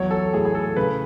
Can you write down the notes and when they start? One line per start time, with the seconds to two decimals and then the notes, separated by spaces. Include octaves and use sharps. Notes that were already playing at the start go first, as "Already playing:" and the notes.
Already playing: E2 F#3 C#5
0.11 A4
0.33 A2 G#4
0.45 G#4
0.55 A4
0.77 C#3 B4